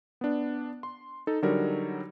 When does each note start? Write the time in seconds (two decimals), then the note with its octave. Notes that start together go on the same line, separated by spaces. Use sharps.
0.21 B3 D4
0.83 C6
1.27 D#4 A4
1.42 D3 F#3 G3 D#4 A#4